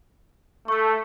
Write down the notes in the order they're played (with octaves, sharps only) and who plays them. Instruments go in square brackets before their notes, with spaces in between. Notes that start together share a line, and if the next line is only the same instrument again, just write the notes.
[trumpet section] A3 [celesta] C#6 E6